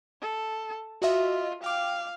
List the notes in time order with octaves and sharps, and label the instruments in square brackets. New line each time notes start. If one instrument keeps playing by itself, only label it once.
[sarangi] A4
[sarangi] F4 [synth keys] F#4 D#5 E5
[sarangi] F5 [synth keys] G5 D6